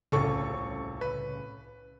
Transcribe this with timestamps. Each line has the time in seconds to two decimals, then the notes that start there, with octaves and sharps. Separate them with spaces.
0.12 D#1 C2 A2 C#3 A4 C#6
1.01 B4